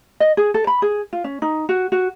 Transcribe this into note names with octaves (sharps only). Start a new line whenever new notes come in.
D#5
G#4
A4
B5
G#4
F4
C#4
D#4
F#4
F#4